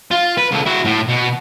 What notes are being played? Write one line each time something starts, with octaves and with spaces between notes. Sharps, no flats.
F4
B4
C#2 A4
E4 F#4
A2
B2